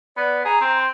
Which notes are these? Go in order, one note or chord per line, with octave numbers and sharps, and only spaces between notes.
B3 D5
G#4 A#5
C4
C6